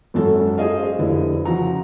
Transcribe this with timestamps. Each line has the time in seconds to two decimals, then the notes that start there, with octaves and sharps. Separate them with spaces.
0.14 G#1 F#2 C#4 F#4 A4
0.57 G#4 C5 D#5 F5
0.98 F1 D3 E4 B4
1.45 C#3 F3 F#4 A#5